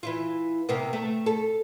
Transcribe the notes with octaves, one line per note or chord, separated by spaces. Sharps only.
E3 E4 F4
C3 A#3 B3
A3
A4